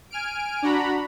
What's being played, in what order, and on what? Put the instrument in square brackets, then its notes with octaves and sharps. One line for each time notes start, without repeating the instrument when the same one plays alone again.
[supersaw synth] G#5 F6 D7
D4 F#4 A#5 B5